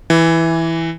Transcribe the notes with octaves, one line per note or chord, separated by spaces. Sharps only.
E3